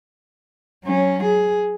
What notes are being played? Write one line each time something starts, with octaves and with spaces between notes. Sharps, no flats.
F#3 C#4
G#4